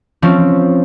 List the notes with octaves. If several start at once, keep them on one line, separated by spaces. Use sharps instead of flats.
F3 C4 C#4